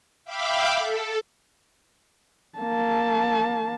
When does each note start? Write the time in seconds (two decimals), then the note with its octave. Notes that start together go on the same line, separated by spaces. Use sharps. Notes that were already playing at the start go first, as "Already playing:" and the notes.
0.25 E5 F5 G5 B5 D6
0.78 A4
2.59 A#3 A5